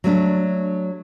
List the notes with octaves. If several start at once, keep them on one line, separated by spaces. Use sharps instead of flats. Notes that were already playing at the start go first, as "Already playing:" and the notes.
F#3 A3 D4